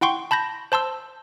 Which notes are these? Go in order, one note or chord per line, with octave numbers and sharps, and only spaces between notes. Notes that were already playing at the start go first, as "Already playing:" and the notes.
E4 F#5 G5 C6 C#6
A5 B5 G6 A#6
C5 A5 C6 E6